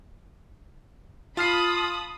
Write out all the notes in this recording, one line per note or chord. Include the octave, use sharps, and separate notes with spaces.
F4 A5 B5 D#6 F6 C7